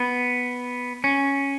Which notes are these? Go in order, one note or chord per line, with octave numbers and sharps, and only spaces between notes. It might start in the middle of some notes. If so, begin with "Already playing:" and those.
Already playing: B3
C#4